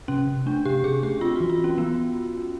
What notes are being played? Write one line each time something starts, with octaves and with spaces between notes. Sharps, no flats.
C3 C#4
C3
A3 D4
C3 G4
C3 G#4
A3 G4
C4 F4
E3 F#4
F4
C4
C#4
E3 B3